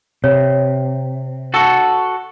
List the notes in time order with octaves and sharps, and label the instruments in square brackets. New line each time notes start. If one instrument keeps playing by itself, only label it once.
[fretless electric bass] C3 [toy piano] C#5
[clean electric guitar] F#4 A4